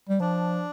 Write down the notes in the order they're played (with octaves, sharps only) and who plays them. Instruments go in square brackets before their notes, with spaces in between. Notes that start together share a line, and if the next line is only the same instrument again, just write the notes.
[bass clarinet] G3
[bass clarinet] F3 [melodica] D4